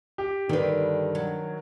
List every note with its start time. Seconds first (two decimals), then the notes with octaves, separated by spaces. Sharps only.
0.18 G4
0.49 G2 D3 D#3 D4 B4
1.15 F#3